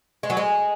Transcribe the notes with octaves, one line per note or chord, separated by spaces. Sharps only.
G#3
F#3
G#3